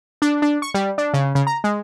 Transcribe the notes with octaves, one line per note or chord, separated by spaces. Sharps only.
D4
D4
C#6
G3
D4
C#3
C#3
A#5
G#3